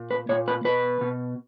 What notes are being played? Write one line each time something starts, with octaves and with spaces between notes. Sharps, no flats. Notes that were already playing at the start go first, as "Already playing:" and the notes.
Already playing: A#2
B4
A#2 C#5
B4
B2 B4
B2